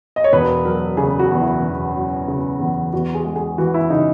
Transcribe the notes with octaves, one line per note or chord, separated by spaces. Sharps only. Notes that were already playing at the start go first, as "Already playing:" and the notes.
D#5
C#5
E1 B4
F#3 A#4
C#3 G#4
F#4
E2
E4
E1
F#3
C#3
E2
E2 F#4
G#4
G#3
G#4
E3 F#4
E4
C#3 D#4